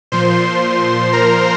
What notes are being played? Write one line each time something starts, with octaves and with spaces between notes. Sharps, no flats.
A#2 F3 C5 C6
A#4 A#5